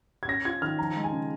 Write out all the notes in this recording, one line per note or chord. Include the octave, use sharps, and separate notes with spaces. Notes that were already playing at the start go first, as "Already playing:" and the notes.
G#6
C#4 A#6
F4 G#6
D#3 F6
F3 A#5
G#3
G#5
C#3